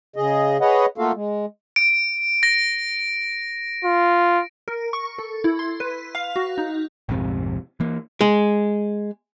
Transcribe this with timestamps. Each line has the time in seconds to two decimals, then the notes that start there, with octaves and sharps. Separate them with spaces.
0.16 C#3 G#4 D#5
0.61 G#4 B4 C#5 D#5 F#5
0.98 A3 A#3 F4 F#4 A4 F5
1.14 G#3
1.76 D7
2.43 A#6
3.85 F4
4.68 A#4
4.93 C#6
5.18 A4
5.44 E4
5.59 C6
5.80 B4
6.15 F5
6.36 F#4
6.58 D#4
7.09 A#1 F2 G#2 C3
7.80 E3 A#3
8.21 G#3